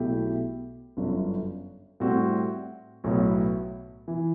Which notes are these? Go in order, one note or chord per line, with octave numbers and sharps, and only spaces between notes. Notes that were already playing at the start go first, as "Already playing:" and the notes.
Already playing: B1 B2 A3 E4 G4
G1 F#2 D3
A2 G3 C4 F#4
B1 A2 F#3 B3
E3